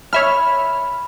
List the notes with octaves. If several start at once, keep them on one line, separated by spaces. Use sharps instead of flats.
C#5 E5 B5 F6